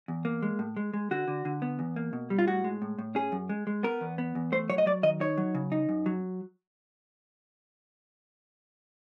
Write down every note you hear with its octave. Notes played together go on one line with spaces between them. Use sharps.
E2
A#3
G#3
A2
G#3
G#3
D3 F#4
D3
D3
B3
E2
A#3
B2
G3
F4
A2 F#4
G#3
A2
A2
C#4 G#4
F#2
G#3
G#3
B3 A#4
E2
B3
E2
A3 C5
F#3 C#5
D#5
F#3 D5
D#3 D#5
D#4 C#5
F#3
C#3
D#4
F#2
F#3